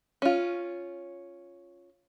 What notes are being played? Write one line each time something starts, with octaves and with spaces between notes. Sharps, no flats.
C#4 F4